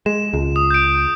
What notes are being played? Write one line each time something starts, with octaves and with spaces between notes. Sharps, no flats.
G#3 E7
C#2
D#6
G6 D7